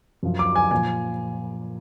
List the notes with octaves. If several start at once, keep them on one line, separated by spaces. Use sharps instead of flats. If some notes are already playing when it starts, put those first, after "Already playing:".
F#2 F3
D6
G#5
A#2 F3 G#5